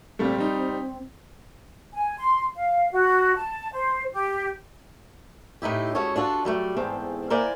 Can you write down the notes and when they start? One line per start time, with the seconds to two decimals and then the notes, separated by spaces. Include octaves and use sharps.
0.19 A#2 G3 A3 C4
0.38 G3 D#4
1.94 G#5
2.19 C6
2.55 F5
2.91 F#4
3.36 A5
3.73 C5
4.12 G4
5.62 A2 D#4 E4 G4
5.95 G#3 C#4 F#4 A4 C#5
6.16 D4 F4 F#4 A4
6.45 F#3 G3 A3
6.77 E2 G#2 A3 C4
7.30 A#3 E4 A#4 C5 D5 G#5